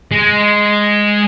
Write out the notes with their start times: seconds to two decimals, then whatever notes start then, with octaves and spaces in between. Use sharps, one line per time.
0.11 G#3